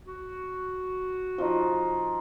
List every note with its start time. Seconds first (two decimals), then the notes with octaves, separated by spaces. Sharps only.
0.05 F#4
1.38 F3 D#4